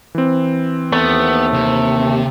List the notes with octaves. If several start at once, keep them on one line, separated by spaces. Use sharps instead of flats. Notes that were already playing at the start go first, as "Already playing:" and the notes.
E3 C4
D#2 A3 B3
C3